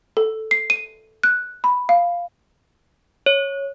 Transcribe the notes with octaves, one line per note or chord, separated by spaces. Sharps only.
A4
C7
D#7
F#6
B5
F5
C#5